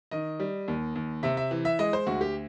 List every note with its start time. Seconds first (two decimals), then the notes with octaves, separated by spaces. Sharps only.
0.11 D#3 D#5
0.40 G3
0.68 D#2
0.96 D#2
1.23 C3 E5
1.37 E5
1.51 E3
1.65 E5
1.79 G#3 D#5
1.93 C5
2.07 D2 F#4
2.21 G4